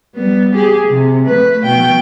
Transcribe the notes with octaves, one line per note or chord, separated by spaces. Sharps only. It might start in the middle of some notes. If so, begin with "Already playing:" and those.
G3 B3
G4 G#4
C3
A3 B4
B2 G5